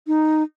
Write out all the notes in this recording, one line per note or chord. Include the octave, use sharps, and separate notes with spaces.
D#4